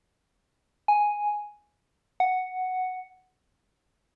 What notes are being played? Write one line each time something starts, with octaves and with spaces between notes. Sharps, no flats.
G#5
F#5